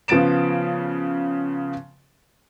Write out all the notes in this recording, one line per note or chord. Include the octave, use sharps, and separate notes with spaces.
C#3 F3 B3 A6 D7 E7